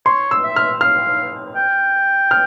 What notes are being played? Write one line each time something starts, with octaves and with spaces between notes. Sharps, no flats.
C#5 C6
E6
E5
F6
F5 F6
G5
F6